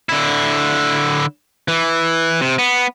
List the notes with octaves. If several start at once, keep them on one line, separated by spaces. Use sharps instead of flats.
D3 E4
E3
C3
B3